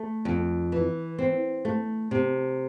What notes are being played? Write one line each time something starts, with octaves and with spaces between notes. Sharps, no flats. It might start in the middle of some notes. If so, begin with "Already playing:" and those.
Already playing: A3
F2
E3
C4
A3
C3